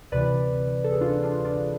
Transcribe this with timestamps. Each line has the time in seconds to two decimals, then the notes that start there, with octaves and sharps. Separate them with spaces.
0.12 D2 C3 E3 B4 D5
0.84 A4
0.92 G#4
1.01 D4 F4
1.23 D4 F4
1.45 D4 F4